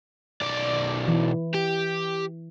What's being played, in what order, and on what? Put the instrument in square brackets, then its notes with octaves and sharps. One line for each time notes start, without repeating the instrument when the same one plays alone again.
[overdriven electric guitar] B1 D5
[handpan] E3
[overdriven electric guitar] G4